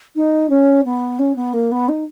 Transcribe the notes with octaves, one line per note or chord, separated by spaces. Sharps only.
D#4
C#4
B3
C#4
B3
A#3
B3
D#4